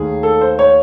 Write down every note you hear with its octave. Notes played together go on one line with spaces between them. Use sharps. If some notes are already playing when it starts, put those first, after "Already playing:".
Already playing: D#2 D#3 A3 G#4
A4
C5
C#5